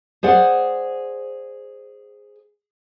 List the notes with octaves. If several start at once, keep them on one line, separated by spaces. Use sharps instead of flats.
G#4 C5 D5 F#5